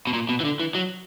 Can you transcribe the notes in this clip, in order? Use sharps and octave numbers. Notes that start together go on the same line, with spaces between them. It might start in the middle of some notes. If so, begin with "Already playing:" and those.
B2
A#2
B2
E3
D3
E3
F#3